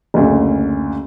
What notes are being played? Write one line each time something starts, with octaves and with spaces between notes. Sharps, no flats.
F#1 D2 C#3